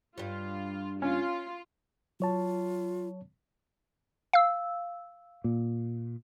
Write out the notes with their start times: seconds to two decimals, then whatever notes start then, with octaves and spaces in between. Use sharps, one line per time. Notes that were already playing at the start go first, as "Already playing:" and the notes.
0.18 G2 G3 F4
1.02 C#4 F4
2.20 F#3 F4 C#5 A5
4.33 F5 E6
5.44 A#2